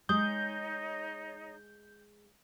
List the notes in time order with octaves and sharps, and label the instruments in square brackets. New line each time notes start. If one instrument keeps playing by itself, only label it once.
[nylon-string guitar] G#3 [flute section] D#4 C#5 [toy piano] D#6 [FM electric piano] G6